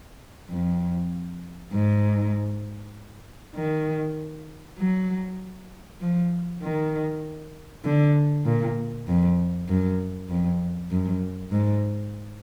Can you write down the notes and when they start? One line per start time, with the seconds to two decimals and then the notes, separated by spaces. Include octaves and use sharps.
0.50 F2
1.72 G#2
3.55 D#3
4.78 F#3
6.00 F3
6.62 D#3
7.85 D3
8.45 A#2
9.08 F2
9.69 F#2
10.29 F2
10.91 F#2
11.52 G#2